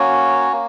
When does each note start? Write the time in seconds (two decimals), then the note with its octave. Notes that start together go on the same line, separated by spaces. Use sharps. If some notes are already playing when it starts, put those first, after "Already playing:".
Already playing: A#3 C#4 F#4 C#5
0.52 A#3